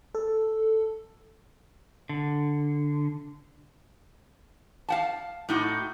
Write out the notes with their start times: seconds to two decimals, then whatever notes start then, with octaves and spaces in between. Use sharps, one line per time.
0.15 A4
2.09 D3
4.89 F5 F#5 A5
5.49 A2 D#4 F#4